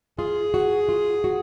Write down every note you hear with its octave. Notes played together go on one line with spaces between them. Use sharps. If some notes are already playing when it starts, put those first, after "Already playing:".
F4 G#4
F#4
F4
F#4